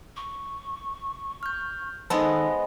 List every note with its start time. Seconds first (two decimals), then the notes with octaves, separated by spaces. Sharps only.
0.16 C#6
1.43 F6 G6
2.10 D#3 G#3 B3 A4 C5 D#5